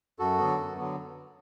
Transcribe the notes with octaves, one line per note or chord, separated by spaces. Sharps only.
F#2 F#4 A4
D3 F#3 B3
F#2
D3 F#3 B3